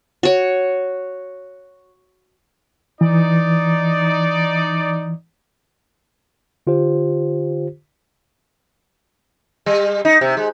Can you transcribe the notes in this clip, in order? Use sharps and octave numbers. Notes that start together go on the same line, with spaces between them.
F#4 C#5
E3 D#4 D5
D3 F4 G4 C5
G3
D#4
C3
G#3